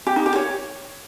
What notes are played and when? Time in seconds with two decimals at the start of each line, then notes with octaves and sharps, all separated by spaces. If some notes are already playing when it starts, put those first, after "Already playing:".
0.07 G4
0.16 D#4
0.26 G4
0.36 C#5